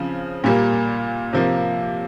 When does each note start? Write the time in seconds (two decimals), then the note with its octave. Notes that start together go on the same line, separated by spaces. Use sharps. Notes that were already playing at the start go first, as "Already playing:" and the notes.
Already playing: C#3 F3 C4
0.44 A#2 G3 A#3
1.33 C3 F3 A#3